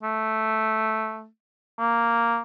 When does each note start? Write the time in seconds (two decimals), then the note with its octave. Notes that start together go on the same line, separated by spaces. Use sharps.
0.03 A3
1.79 A#3